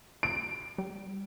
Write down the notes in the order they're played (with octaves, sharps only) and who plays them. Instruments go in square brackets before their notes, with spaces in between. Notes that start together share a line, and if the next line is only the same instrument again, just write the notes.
[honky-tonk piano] D7
[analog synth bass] G3